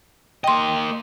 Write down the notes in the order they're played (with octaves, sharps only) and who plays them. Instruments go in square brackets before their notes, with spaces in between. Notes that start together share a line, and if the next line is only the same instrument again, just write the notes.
[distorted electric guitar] A#3 D#5 [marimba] G5 C6